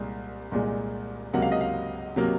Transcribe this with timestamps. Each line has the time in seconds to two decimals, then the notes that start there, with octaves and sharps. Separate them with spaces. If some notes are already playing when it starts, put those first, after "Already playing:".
Already playing: C2 A#2 G#3
0.52 C2 A#2 G#3
1.33 C#2 C3 F#3 A#3 F#5
1.42 F5
1.52 D#5
1.61 F5
2.16 C3 F#3 A#3